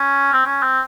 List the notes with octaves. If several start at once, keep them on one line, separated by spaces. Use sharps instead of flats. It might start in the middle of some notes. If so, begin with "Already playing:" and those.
Already playing: C#4
C4
C#4
C4